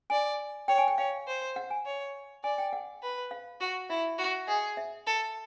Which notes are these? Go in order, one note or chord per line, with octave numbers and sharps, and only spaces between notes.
D5 G#5
C#5 G5
G#5
G5
C#5 F5
C5
F#5
G#5
C#5
D5 G#5
G5
F#5
B4
F5
F#4
E4 E5
F#4
G#4 D#5
E5
A4